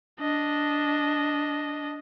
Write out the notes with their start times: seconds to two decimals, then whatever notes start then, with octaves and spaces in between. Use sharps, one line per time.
0.20 D4 D#5